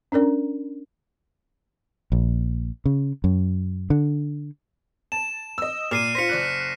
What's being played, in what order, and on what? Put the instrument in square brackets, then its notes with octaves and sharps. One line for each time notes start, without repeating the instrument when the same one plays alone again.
[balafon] C#4 D4 A#4 D5
[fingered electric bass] A#1
C#3
F#2
D3
[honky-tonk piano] A5 [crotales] E7
[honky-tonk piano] D#5 E6
[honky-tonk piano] A#2 [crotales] F6 C7 D#7
[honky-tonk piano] F4 C5 [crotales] A#6 B6 C#7
[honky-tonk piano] F#1 D5 F#6